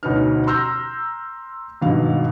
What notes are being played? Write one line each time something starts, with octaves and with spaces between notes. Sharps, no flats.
D2 B2 C#4 D#4 B4 F6
A#5 C6 E6 F6 G6 A#6
G#1 G2 B2 D#4 F5